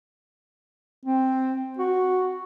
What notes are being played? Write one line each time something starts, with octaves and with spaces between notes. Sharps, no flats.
C4
F#4